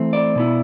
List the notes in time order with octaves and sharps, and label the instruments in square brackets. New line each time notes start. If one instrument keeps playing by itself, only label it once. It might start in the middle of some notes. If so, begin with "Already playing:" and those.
Already playing: [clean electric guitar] E3 A3 C4
D5
B2 B3 E4